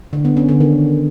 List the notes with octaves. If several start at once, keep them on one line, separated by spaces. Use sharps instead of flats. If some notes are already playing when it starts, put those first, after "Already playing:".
D3
B3
C#4
D3
D#3